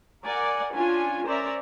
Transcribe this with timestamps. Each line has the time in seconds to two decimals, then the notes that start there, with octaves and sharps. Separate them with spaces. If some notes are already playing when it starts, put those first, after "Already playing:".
0.23 A#4 D5 F#5 G#5
0.73 C#4 D4 F4 G#5
1.26 C#4 A#4 C5 D5 E5 A#5